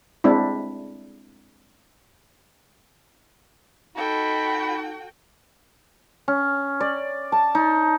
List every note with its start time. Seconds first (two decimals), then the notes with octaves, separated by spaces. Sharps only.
0.24 G#3 C4 D4 E4
3.96 D#4 F#4 A4 G5 B5
6.28 C#4
6.80 D5
7.32 A5
7.55 D#4